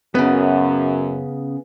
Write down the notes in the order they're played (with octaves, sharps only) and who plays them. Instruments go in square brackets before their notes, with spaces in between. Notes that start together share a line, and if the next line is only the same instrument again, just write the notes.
[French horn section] F#2 [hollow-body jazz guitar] C#3 B3